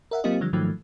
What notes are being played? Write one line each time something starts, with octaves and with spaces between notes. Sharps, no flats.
A#4 E5 F#5
F#3 A#3 C4 F4 G4 D#5
D3 F3 G3
G#2 D#3 F3 F#3 A3